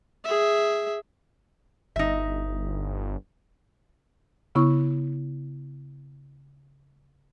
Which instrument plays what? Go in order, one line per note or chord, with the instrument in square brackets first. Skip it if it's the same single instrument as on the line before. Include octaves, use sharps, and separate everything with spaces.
[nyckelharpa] G#4 E5
[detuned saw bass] G1 [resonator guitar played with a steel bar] D#4 E5
[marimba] C#3 B3 E4 C#6